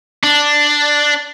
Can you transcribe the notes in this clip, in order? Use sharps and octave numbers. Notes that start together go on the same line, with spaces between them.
D4